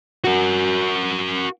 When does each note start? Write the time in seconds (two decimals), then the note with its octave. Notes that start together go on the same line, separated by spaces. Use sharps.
0.24 F#4 A#4